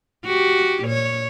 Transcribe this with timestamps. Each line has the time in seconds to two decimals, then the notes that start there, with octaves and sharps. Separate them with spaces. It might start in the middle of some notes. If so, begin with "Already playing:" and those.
0.25 F#4 G4
0.83 A#2 C#5